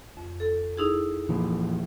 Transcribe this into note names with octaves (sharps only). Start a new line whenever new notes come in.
F2
A4
D#4 E4 G#4
A#2 E3 F3